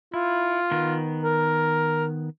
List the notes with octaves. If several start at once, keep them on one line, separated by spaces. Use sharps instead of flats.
E4 F4
D#3 B3
A#4